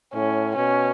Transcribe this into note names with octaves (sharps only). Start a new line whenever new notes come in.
A2 C#4
B2 C#4